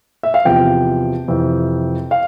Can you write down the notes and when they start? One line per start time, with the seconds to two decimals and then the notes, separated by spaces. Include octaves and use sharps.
0.23 E5
0.34 F5
0.45 E2 C3 F3 G5
1.28 F2 C3 E3
2.11 F5